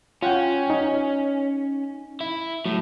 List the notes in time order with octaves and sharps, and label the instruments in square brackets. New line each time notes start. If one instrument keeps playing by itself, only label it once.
[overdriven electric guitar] C#4 [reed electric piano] F4 F#5 G5
[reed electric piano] D#4
[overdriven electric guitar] E4
[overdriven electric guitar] A2 [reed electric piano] F#3